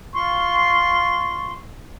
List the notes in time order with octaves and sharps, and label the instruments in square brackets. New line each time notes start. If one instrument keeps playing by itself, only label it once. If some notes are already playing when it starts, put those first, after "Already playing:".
[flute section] F4 C6 C#6